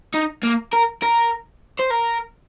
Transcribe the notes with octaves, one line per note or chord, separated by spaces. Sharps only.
D#4
A#3
A#4
A#4
C5
A#4